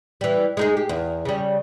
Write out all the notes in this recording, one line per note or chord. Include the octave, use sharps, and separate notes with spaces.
E3 G3
G#3 D#4 G#4
G4
E2
C#3 G3